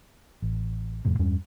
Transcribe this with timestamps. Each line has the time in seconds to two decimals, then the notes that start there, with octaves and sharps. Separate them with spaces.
0.42 A1
1.05 D#1 F2 A2 C3
1.19 E2 G2 G3 C#4